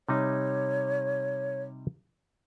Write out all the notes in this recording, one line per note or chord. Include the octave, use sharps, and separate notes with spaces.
C3 G3 D#4 C#5